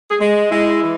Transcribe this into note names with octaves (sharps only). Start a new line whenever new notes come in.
G#4
G#3
G#3 E4
E3